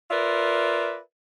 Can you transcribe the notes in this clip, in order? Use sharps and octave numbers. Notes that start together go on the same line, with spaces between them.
F4 A#4 B4 D5 E5